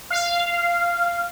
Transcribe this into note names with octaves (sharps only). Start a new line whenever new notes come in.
F5